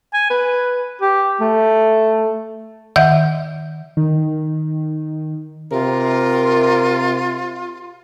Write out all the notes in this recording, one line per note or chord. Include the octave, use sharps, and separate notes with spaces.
G#5
B4
G4
A3
D#3 D#5 E5 F#5 G6
D#3
C3 F4 A#4